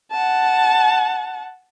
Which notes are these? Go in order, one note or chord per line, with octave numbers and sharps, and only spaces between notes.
F#5 A5